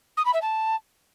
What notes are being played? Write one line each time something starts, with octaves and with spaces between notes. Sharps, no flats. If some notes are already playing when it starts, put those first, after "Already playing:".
D#6
B5
E5
A5